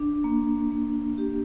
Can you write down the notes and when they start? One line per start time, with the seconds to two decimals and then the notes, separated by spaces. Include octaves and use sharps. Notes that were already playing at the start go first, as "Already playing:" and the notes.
Already playing: D4
0.24 A#3
0.71 A#3
1.18 G4